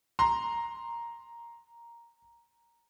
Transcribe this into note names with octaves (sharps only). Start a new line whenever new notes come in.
A#5 C6